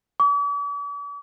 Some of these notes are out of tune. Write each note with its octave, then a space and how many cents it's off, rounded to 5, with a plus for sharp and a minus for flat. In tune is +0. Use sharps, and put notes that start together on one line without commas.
D6 -45